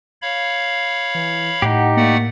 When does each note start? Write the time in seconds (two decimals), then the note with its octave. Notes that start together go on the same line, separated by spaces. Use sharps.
0.22 C#5 F5 B5
1.14 E3
1.62 A2 D#4 G4 F#5
1.97 A3 A#3 D5 F#5